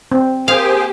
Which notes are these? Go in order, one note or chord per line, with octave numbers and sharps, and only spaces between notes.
C4
A#3 G4 G#4 C5 F5 G#5